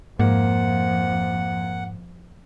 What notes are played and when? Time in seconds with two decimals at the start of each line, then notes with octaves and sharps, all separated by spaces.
0.19 F2 G#2 F3 A#3 F#5